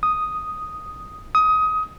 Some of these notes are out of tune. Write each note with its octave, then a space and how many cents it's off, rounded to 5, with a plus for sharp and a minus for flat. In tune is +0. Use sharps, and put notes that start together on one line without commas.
D#6 +0
D#6 +20